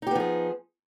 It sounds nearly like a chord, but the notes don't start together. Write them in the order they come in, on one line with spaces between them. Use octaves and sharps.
D#4 G4 B3 F3 G#4